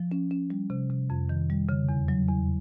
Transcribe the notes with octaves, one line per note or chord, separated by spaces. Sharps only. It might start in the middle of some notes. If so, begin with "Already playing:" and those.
Already playing: F3
C#4
C#4
G3
C3
C3
F2
D#3
G3
C#3
E2
F#3
E2